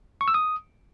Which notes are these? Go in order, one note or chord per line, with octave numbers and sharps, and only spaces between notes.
C#6
E6
D#6